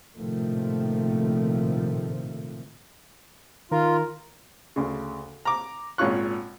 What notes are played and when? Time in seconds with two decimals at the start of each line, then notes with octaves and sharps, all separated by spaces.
0.16 A#1 A2 C3 D#3 F3 A3
3.71 D#3 F4 A#4
4.76 D2 C#3
5.45 A#5 D6
5.98 G#1 A#2 C#4 F4 C#6 F#6